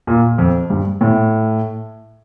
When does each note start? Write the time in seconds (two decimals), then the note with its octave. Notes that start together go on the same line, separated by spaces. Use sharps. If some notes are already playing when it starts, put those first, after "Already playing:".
0.07 A#2
0.38 F2
0.70 G2
1.01 A2